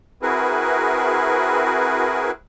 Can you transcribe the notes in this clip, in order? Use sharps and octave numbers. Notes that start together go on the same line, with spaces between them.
C4 E4 F#4 G#4 A#4 B4